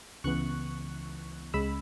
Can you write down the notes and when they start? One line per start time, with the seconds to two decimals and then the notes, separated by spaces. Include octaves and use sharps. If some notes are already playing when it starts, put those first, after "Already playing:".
0.24 C#2 C#3 E3 B3 C#6 F#6
1.54 C#2 C#3 G#3 B5 E6